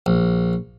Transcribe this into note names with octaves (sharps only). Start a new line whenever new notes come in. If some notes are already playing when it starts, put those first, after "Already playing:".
A#1